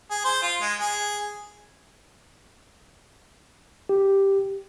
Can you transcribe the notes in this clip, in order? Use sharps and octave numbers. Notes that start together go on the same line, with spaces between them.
G#4
C5
F4
G#3
G#4
G4